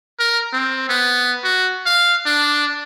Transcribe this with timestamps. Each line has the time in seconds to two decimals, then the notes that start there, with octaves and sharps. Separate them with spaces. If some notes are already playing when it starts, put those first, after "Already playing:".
0.19 A#4
0.53 C4
0.89 B3
1.44 F#4
1.86 F5
2.26 D4